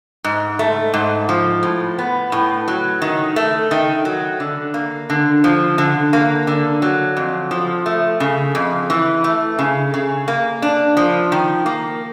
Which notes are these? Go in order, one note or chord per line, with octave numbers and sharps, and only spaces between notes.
G#2
A3
G#2
F3
A2
B3
A2
F#3
D#3
A3
D#3
F#3
D3
A#3
D3
F3
D3
A#3
D3
F#3
F2
F3
A3
C#3
F2
E3
A3
C#3
C#3
A#3
D4
F3
D#3
A#3